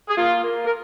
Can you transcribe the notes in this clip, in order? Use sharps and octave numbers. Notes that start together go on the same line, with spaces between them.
G#4
A#3 F4
A#3
A#4